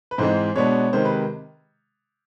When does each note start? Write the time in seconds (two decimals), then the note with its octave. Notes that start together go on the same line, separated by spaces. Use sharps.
0.11 B4
0.18 G#2 E3 G#3 C4 C5
0.56 B2 G#3 B3 D4 C#5
0.93 C3 D#3 G#3 C5
1.05 B4